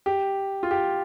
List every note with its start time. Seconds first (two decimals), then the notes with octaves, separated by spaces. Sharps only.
0.06 G4
0.63 F4
0.71 G4